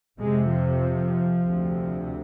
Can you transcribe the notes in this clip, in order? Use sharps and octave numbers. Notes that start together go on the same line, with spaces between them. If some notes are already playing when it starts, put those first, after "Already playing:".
F2 C3 G#3
F3
D2 C3